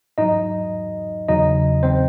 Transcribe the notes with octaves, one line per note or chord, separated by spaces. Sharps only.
G#2 F#3 D#4 D#5
E2 C#3 F#3 D#4 D#5
C4 C5